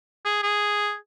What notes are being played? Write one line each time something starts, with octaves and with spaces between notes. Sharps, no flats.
G#4
G#4